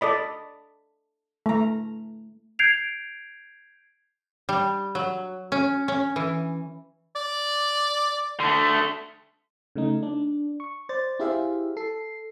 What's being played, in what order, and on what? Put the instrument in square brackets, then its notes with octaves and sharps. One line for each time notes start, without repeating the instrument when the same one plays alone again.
[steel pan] A4 D5 D#5 B5
A3 A#5
[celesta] G6 G#6 C7 D7 F7
[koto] G3
F#3
C#4
C#4
E3
[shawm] D5
[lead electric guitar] D3 A3
[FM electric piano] C#3 A3 D#4
D4
C#6
C5 D5 A6
E4 G4 G#4 C5 E5 F5
A4 C7